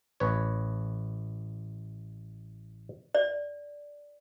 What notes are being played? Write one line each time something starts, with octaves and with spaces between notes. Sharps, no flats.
A1 B4 C#5
D5